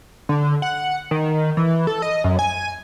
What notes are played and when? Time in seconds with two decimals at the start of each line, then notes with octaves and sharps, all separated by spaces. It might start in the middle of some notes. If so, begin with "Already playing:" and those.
0.29 D3
0.62 F#5
1.11 D#3
1.57 E3
1.87 A4
2.02 D#5
2.24 F#2
2.39 G#5